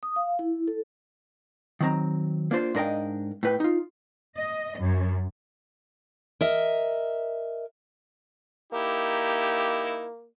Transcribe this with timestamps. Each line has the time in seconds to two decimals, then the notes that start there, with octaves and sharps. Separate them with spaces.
0.03 D#6
0.16 F5
0.39 E4
0.67 A4
1.81 D#3 F#3 C4 A#5
2.51 A#3 D4 F4 C5
2.75 G#2 D4 A#4 D#5 F5 G5
3.43 A2 B4 G5
3.60 D#4 F4
4.38 D#5
4.79 F#2
6.41 A#4 D#5 E5
8.72 A#3 D#4 E4 G4